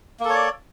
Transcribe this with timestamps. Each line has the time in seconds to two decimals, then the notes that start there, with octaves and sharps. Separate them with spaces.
0.20 A#3
0.25 A4
0.30 C#5
0.35 D5